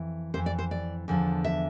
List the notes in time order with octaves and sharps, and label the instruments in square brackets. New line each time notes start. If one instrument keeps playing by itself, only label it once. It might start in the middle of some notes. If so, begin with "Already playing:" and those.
Already playing: [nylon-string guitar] F2 E3
F2 E3 C5
D5
C5
D5
E2 D3 F3
E5